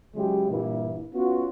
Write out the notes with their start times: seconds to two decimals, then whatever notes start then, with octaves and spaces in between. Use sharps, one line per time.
0.15 C#3 F#3 G#3 E4 G4
0.50 G2 A#2 E3 A#3 E4
1.13 B3 C#4 F4 F#4